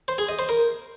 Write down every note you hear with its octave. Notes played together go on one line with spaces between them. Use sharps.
C5
G#4
D#5
C5
A#4